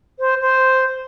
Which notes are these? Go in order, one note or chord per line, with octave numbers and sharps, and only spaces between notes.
C5
C5